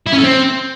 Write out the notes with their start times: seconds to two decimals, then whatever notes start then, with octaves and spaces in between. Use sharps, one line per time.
0.07 E4
0.12 C#4
0.18 A4
0.24 C4